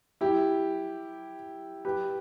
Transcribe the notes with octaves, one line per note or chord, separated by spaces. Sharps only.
E4 G4
G4 B4